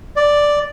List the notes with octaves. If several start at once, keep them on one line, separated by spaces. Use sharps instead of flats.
D5